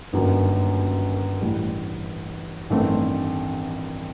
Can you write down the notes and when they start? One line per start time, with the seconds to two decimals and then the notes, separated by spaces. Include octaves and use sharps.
0.13 G1 F#2 D#3 F#3 A#3
1.41 A1 A2 G3
2.70 A1 G2 D#3 A3 C4